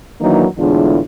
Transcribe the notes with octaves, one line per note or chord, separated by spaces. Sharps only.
D#3 E3 F#3 A#3 D4 D#4
E2 A2 D3 G#3 D4 F4